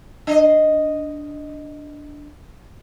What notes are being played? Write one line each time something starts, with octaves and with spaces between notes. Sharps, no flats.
D4 D#5